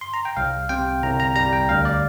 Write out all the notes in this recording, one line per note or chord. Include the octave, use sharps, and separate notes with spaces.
C6
A#5
G5
C2 F5
C3 G5
C2 A#5
A#5
G3 A#5
G5
D2 F5
D5